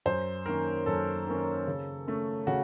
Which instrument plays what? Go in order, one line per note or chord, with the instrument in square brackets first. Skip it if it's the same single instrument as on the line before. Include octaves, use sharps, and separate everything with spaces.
[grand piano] F#2 C5
D#3 A#3 C#4 A#4
F#2 A4
D#3 A#3 C#4
C#3
A3 C#4
C#3 F#4